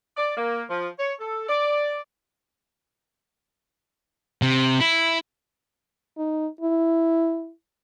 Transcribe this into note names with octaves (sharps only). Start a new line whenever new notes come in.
D5
A#3
F3
C#5
A4
D5
C3
E4
D#4
E4